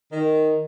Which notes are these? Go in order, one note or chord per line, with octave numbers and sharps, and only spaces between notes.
D#3